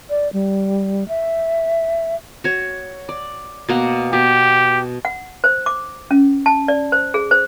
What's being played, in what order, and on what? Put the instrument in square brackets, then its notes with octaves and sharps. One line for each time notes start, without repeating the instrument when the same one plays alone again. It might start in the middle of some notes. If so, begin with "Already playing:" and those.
[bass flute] D5
G3
E5
[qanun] F#4 C#5
D5
B2 A#3 F#5
[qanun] B2 [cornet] G4
[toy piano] F#5
C5
D6
C#4
A5
D5
C5
G#4
C5